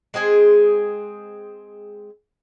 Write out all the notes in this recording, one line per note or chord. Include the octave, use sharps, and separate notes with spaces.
G#3 C4 G#4 G#5